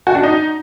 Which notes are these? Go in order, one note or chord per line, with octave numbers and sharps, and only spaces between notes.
F#4
D4
D#4